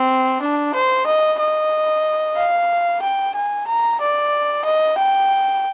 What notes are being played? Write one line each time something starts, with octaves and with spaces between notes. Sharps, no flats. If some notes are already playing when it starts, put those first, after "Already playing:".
Already playing: C4
D4
C5
D#5
D#5
F5
G5
G#5
A#5
D5
D#5
G5